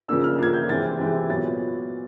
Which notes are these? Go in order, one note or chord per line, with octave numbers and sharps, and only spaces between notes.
C#3 F3 A#3 D4 E6
F6
C#3 F3 A#3 D4 G#6
G6
C3 E3 G#3 C4 A6
C3 E3 G#3 C4
A#2 F#3 B3 A6